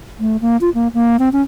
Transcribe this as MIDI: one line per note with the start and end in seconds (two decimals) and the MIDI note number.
0.20 0.37 57
0.41 0.57 58
0.61 0.70 65
0.74 0.88 58
0.94 1.17 58
1.19 1.29 60
1.33 1.42 61